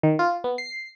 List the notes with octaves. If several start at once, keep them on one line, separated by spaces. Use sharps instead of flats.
D#3
F4
B3
C7